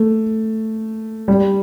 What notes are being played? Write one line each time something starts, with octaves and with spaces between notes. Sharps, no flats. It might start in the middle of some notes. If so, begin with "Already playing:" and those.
Already playing: A3
G3